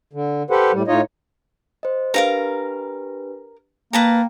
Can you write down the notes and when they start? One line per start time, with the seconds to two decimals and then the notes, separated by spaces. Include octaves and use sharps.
0.13 D3
0.50 G4 A4 B4 C5 F#5
0.73 A2 G3
0.88 A2 D#4 F4 C#5 D#5
1.83 C5 D#5
2.14 D4 G4 A#4 B4 F5 A#5
3.93 A#3 B4 G5 A5 A#5